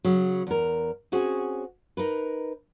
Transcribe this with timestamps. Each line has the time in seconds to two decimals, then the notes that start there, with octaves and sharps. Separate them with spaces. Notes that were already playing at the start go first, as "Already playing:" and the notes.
0.04 C#3 F#3
0.47 E2 A#4
1.12 C4 C#4 F#4 G#4
1.97 D#4 A#4 B4